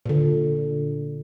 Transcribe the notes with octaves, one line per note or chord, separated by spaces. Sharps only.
A#2 D3